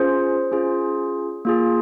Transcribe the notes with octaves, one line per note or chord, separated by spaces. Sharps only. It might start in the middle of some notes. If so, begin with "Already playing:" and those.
Already playing: C#4 F4 G#4 C5
C#4 F4 G#4
A#3 F4 G#4